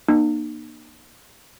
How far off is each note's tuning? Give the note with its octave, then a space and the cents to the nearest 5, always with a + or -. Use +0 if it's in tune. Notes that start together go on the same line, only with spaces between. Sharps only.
A#3 +30 D#4 -40